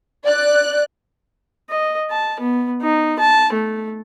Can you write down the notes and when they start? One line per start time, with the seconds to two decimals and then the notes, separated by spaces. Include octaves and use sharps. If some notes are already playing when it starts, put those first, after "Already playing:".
0.25 D5 F#6
1.70 D#5
2.11 A5
2.40 B3
2.82 D#4
3.19 A5
3.53 A3